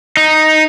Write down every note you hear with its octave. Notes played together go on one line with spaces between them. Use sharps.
D#4